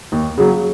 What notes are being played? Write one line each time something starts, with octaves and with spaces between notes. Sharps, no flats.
D#2
C#3 F#3